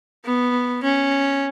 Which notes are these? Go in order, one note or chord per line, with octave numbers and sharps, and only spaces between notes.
B3
C#4